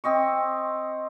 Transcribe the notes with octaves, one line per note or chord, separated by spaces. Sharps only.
C4 D#5 C#6